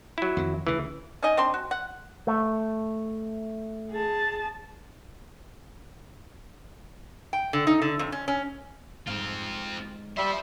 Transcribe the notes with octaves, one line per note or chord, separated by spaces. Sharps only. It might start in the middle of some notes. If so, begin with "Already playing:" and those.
F#3 E4
F2 D#3
D2 C#3 E3
C#4 D#4 D#5 G#5
C4 D4 C6
F#4
F#5
A3
G#4 A5
G5
D3
D#4
D3
F2
C#4
C#4
G#2 C4 F4
G3 C5 E5 F5